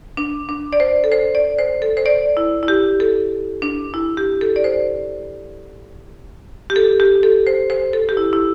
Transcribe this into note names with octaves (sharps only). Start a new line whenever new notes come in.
D4
D4
D5
C5
A4
C5
D5
C5
A4
C5
D5
E4
E4
G4
A4
D4
E4
G4
A4
D5
C5
G4
A4
G4
A4
C5
C5
A4
G4
E4
E4